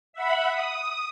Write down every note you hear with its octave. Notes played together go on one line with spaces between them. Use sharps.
E5 F#5 B5
D#6